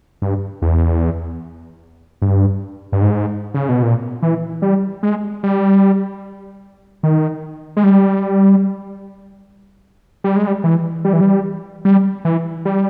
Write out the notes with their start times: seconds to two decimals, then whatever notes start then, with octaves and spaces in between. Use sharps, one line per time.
0.22 G2
0.62 E2
2.22 G2
2.92 G2
3.02 G#2
3.54 C#3
3.69 B2
3.83 A#2
4.22 E3
4.62 G3
5.03 G#3
5.43 G3
7.03 D#3
7.77 G#3
7.83 G3
10.24 G3
10.36 G#3
10.47 G3
10.64 E3
11.05 G3
11.13 E3
11.21 G3
11.85 G3
12.25 E3
12.65 G3